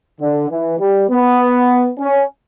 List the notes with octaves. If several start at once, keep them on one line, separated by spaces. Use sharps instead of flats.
D3
E3
G3
B3
C#4